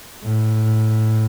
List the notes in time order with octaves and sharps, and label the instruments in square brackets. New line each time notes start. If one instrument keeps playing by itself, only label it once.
[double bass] A2